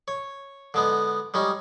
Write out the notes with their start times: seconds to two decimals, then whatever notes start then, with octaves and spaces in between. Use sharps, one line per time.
0.08 C#5
0.74 D3 G#3 B3
1.34 G3 G#3 C#4 D#4